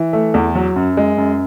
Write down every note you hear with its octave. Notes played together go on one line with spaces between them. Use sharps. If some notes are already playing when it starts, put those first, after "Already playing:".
Already playing: E3
A3
E2
F#3
F#2
G#3
F#2